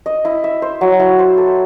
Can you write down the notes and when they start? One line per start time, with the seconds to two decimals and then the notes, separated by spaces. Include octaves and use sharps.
0.06 D#5
0.25 E4
0.44 E5
0.62 C5
0.81 F#3
1.00 E4
1.19 C5
1.38 A4